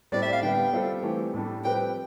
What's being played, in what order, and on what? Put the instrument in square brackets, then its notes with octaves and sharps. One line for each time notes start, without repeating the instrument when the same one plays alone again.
[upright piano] A2 G3 C4 [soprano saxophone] D5
[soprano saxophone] E5
F5
[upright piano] D3 G3 B3 [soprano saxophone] G5
[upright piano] G3 C4 F4 A4
E3 A3 C4 G4
A2 G3 D4 A4
[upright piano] F3 C4 G4 B4 [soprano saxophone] G5